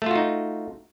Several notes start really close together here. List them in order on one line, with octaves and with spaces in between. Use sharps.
A3 F4 F#4 D#4